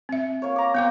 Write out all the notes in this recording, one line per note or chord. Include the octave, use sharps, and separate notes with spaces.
C4 E5
A#3 C#5
A#5 D6
B3 C4 F5 G5 D6